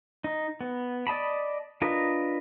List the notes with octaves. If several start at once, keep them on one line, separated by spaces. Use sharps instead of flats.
D#4
B3
D5 D#5 A5 B5
D4 F4 A#4 B4 D#5